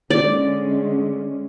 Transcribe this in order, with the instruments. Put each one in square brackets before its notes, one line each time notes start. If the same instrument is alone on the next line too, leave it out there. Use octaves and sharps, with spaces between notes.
[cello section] D3 G#3 C#4 [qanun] D5